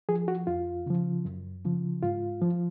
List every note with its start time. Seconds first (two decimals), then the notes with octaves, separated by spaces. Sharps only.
0.09 F3 G#4
0.28 F#4
0.47 F2 F4
0.86 C#3 F3
1.25 F#2
1.65 C#3 F3
2.03 G#2 F4
2.42 F3